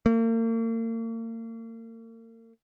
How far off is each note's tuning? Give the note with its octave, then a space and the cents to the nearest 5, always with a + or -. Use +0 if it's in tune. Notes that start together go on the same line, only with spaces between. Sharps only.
A#3 -40